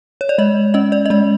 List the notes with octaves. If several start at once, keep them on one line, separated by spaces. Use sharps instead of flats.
C#5
D5
G#3 D#5
C#4 D#5
D5
D#5
G#3 D5